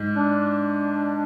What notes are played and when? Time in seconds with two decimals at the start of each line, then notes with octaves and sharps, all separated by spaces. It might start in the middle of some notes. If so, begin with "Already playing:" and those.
Already playing: G#2
0.17 D4